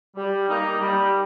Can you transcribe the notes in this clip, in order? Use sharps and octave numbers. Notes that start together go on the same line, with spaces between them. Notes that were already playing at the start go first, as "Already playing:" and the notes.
G3
A#3 D#4
G3